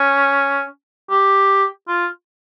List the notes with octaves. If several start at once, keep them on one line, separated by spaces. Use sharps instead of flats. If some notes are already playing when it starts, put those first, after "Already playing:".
Already playing: C#4
G4
F4